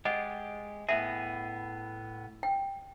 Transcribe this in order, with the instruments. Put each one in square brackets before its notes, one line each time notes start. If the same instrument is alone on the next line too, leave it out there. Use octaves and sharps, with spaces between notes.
[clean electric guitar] G#3 G4 [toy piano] D#5 F#5
[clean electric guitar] A2 B3 G#4 [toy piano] E5
[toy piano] G5